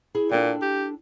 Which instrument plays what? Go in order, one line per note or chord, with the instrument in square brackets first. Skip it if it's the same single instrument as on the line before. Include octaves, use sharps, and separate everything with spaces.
[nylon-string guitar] E4 G#4
[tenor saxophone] A#2 [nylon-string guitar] D4 A4 G5
[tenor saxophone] G4